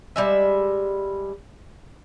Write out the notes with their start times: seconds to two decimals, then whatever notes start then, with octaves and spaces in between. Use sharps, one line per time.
0.16 G3 G#3 E5